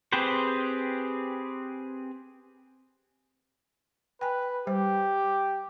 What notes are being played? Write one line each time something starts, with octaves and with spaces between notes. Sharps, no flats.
C4 G4 G#4 B4 C5
B4 G5 G#5
G3 G4 C5